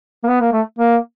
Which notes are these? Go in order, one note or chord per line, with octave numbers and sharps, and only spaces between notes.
A#3
B3
A#3
A3
A#3